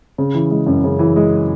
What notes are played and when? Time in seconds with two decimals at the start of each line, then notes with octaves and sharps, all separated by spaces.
0.18 C#3
0.35 E3
0.51 G#3
0.67 F#2
0.84 C#3
0.99 E3
1.16 G#3